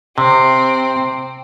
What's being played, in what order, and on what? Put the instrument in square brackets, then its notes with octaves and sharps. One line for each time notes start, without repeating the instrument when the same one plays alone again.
[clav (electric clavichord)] C3 [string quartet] C4